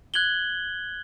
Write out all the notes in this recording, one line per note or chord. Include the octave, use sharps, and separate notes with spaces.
F#6 G#6 F#7 G7